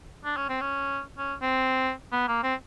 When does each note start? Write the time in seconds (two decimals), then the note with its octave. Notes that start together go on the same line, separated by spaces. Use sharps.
0.25 D4
0.37 C#4
0.49 C4
0.61 C#4
1.18 C#4
1.42 C4
2.13 B3
2.28 A#3
2.43 C4